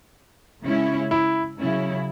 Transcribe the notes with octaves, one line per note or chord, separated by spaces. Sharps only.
C#3 G#3 C#4 E4
E4
C#3 F#3 C#4 E4